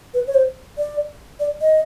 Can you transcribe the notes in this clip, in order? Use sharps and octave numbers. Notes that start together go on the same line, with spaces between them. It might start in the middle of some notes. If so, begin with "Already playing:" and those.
B4
C#5
C5
D5
D5
D#5